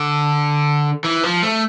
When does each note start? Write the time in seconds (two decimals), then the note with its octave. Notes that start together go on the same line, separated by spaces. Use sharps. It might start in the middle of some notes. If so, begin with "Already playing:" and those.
Already playing: D3
1.04 E3
1.23 F3
1.43 A3